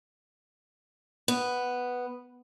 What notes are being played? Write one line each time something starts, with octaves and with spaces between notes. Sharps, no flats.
B3